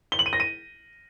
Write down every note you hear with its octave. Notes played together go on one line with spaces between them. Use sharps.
G7
F#7
D#7
A#6
D#7